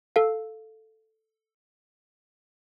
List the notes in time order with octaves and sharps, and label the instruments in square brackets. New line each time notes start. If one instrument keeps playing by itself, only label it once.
[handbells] A4 F5